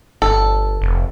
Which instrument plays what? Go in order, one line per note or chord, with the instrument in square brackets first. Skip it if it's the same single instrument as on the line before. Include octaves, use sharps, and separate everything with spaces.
[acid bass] G1 [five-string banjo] A4
[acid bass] F1